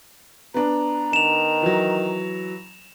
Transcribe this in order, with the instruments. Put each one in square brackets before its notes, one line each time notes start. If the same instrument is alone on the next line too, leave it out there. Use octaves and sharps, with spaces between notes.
[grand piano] B3 D4 [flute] A#5
[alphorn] D#3 [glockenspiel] E7 F7
[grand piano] E3 F#3